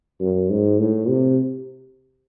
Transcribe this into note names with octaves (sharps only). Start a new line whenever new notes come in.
F#2
G#2
A2
C3